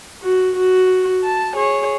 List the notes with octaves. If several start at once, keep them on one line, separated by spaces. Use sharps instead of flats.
F#4
F#4
A5
G#4 C#5